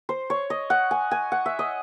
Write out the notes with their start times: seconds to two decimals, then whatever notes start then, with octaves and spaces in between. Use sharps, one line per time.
0.09 C5
0.30 C#5
0.50 D#5
0.70 F#5
0.91 G#5
1.11 G#5
1.32 F#5
1.46 E5
1.59 D#5